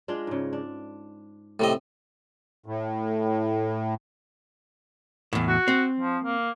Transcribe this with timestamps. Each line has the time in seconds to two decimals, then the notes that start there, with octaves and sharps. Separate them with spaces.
0.08 G#3 D4 F4
0.27 G#2 C#3
0.53 D4
1.60 A2 C3 D#5
2.66 A2
5.33 E2 A2
5.49 F#4
5.68 C4
6.00 F3
6.24 A#3